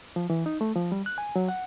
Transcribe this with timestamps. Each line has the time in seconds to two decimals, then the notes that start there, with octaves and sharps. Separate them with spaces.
0.16 F3
0.30 E3
0.46 D#4
0.61 A3
0.76 F3
0.92 G3
1.06 F#6
1.18 G#5
1.36 F#3
1.48 F#5